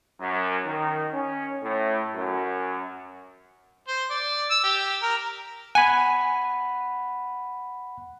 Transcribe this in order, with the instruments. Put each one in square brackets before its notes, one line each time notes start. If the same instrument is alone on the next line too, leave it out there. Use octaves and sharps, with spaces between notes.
[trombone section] F#2
D#3
C#4
A2
F#2
[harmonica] C5
D5
E6
G4
A#4
[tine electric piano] F#5 B5 [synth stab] G#5